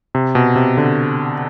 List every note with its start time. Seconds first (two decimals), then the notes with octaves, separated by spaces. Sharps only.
0.15 C3
0.35 B2
0.56 C3
0.77 D3